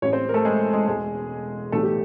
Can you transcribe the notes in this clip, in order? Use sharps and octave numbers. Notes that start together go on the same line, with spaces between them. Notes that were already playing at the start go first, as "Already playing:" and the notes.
A1 A2 E3 G3 C#4 C#5
C4 C5
A#4
A3 A4
G#3 G#4
G#3 G#4
E1 E2 B2 G#3 G#4
B1 A2 E3 G3 A3 A4
G4